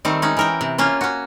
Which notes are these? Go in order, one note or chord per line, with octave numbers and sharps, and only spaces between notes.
D#3 G3 A3 C4
G#3 C#4 D#4
E3 A#4 G5
C3
A#3 C#4 F4
C#4 F#4